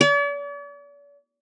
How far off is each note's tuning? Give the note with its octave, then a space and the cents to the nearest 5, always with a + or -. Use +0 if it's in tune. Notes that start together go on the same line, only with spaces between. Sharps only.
D5 -45